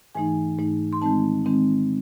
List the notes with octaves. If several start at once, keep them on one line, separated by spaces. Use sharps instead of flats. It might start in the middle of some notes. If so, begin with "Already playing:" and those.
G#2 E3 A3 D#4 G#5
G#2 E3 A3 D#4
C6
D#3 G#3 C4 D#4 A5
D#3 G#3 C4 D#4